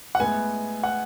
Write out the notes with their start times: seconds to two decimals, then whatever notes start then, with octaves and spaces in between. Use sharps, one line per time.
0.15 F#5
0.20 A2 G#3 B3 G#5
0.83 F#5